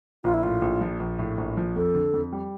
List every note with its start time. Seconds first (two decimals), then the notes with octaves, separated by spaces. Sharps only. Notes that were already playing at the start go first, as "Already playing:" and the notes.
0.24 A#1 F4
0.34 E4
0.43 A2 F4
0.62 A#1
0.81 F3
1.00 A#1
1.19 A2
1.38 A#1
1.57 F3
1.76 F2 A4
1.95 D3
2.14 F2
2.32 G3